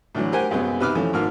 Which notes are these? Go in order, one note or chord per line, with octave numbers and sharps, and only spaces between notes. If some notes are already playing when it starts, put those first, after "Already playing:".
A2 D3 E3 F#3
G4 A#4 C5 F#5 G#5
C2 F#2 G#3 B3
C3 D#4 B4 B5 D6 F6
E3 F3 A3 C#4
G#1 G#2 D#3 A#3 F6